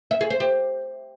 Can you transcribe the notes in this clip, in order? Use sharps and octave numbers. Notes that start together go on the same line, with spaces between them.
E5
G#4
C5
G4